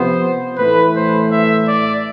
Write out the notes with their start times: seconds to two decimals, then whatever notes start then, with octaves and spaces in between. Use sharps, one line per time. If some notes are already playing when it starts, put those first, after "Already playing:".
Already playing: C3 F3 B3 C5
0.57 A2 E3 A3 B4
0.94 C5
1.31 E5
1.68 D5